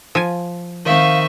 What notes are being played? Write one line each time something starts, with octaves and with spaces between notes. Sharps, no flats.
F3 G#5
D#3 C4 E5 F5 C#6